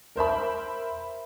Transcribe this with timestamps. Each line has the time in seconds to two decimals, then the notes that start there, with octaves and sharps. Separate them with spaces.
0.16 A#4 C5 E5 B5